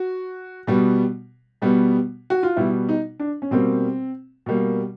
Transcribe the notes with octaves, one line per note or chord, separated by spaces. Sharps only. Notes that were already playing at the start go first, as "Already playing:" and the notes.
Already playing: F#4
B2 G3 B3
B2 G3 B3
F#4
F4
B2 G3 B3 E4
D#4
D4
C#4
B2 G3 A#3 C4
B2 G3 A#3